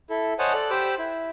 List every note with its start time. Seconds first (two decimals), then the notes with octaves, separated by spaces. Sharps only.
0.10 E4 A4
0.39 C5 C#5 D#5 F#5 G#5 A5
0.53 A4 D5 F#6
0.70 G4 C5 B5 D6 E6
0.99 E4